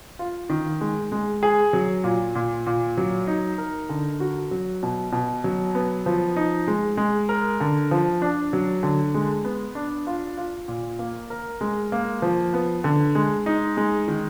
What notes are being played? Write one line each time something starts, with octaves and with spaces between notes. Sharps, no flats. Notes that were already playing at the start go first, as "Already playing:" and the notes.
F4
D#3
G#3
G#3
G#4
F#3
A#2
A#2
A#2
F#3
D#4
A#4
D3
F#4
F#3
B2
B2
F#3
B3
F3
D#4
G#3
G#3
A#4
D3
F3
D4
F#3
D3
G#3
B3
D4
F4
F4
A#2
A#3
A#4
G#3
A#3
F3
B3
D3
G#3
D#4
G#3
D#3